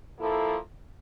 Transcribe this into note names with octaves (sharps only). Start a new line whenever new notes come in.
F3 A#3 E4 A4